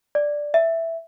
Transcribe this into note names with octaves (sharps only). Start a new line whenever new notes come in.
D5
E5